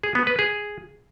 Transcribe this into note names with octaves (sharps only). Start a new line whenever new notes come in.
G#4
B3
B4
G#4